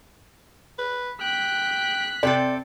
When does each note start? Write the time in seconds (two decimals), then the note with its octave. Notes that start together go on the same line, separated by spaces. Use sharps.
0.79 B4
1.21 G5 F#6 B6
2.23 C3 C4 A4 D5 G5